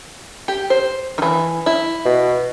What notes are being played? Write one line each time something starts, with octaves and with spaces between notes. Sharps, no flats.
G4
C5
D#3 E3
E4
B2